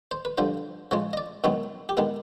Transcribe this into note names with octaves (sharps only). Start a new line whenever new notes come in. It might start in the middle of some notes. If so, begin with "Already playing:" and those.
C5
B4
G2 D3 F3 C5
C#3 F3 G#3 C#5
D#5
D5
F#2 D#3 G#3 B3 C#5
G4
D#3 G#3 B3 G#4